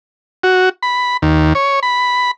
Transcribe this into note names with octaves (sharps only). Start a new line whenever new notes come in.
F#4
B5
D#2
C#5
B5